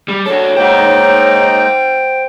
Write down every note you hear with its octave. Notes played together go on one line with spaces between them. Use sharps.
G3
D4 F#4 A4 C#5
G#3 A#3 D#4 C5 F#5 G5